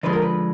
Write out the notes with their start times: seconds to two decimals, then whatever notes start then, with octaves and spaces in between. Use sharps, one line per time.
0.03 D3 F3 G#3 B4
0.13 A#4
0.22 B4